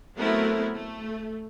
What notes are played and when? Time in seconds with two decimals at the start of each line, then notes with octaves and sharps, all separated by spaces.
0.16 F#3 A3 B3 C4 E4 A#4
0.73 A3